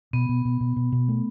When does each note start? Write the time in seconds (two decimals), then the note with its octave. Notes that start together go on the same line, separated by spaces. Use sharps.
0.13 B2 B3
0.29 B2
0.45 B2
0.61 B2
0.76 B2
0.92 B2
1.08 A3